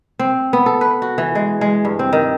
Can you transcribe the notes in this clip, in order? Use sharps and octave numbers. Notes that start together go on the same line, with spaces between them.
C4
B3
A4
B4
F#4
E3
G#3
G#3
G2
C4
D#3